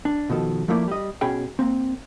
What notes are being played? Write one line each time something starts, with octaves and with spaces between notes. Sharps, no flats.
D4
B2 D#3 F3 A4
F3 A3 A#3 E4 D5
G3 D#5
B2 C#4 G#4 G5 B5
A#3 C4